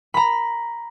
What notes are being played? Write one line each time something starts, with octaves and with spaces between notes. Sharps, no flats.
A#5 B5